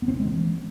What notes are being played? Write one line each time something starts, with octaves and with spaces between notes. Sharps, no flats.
B3
C4
B3
G#3
E3